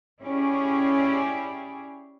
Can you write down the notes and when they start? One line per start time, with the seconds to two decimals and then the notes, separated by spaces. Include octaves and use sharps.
0.22 C#4 E4 G4 G#4 D5